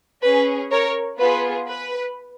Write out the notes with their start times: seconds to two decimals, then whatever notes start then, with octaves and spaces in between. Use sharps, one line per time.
0.23 C#4 G#4 B4
0.71 A#4 C#5
1.19 B3 F4 G#4 B4
1.66 B4